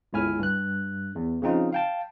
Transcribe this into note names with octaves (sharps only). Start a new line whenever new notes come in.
G1 C#2 E4 G#5 F6
G2 F#6
E2
C#3 F3 C4 D#4 F4
F5 G5 A5